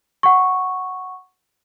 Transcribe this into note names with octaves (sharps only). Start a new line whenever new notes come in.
F#5 C#6